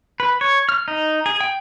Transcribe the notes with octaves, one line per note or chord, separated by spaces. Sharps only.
B4
C#5
F6
D#4
G#4
G5